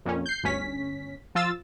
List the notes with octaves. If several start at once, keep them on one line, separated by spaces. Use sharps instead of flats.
F2 A#2 C#4
G6 C7
G1 D2 C#4 B6
F3 F4 E6 A6